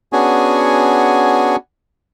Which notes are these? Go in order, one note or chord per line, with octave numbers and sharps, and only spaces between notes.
B3 C#4 D4 F#4 G#4 G#5